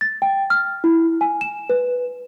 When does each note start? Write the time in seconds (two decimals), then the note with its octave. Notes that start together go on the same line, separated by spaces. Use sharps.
0.01 A6
0.22 G5
0.50 F6
0.84 E4
1.21 G#5
1.41 E7
1.69 B4